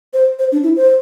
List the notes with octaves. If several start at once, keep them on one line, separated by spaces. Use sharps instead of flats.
C5
C5
D4
E4
C5